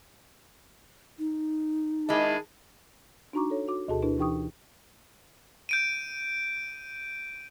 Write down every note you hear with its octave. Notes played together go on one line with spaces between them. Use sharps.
D#4
D#3 G#3 E4 G#4 A5
D4 D#4 F#4 A#5 C#6 D6
A4 C#5
F#4 D6
D2 B2 F#4 G#4 A4 A5
D4 E4 A#4 B4
E3 D#4 G4 G5 C#6 D#6
G6 D7 D#7